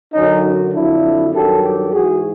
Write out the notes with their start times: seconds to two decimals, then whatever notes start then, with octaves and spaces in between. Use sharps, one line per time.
0.14 F#2 D3 F#3 C#4 D#4
0.74 F2 D3 F#3 D4 E4
1.34 G2 D#3 F#3 G4 A4
1.64 G4 A4
1.93 G#2 E3 F#4 G#4